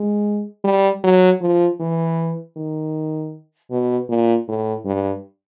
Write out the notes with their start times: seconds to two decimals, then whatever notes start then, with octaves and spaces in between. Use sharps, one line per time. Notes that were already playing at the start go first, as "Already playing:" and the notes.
Already playing: G#3
0.64 G3
1.04 F#3
1.41 F3
1.80 E3
2.57 D#3
3.71 B2
4.09 A#2
4.48 A2
4.85 G2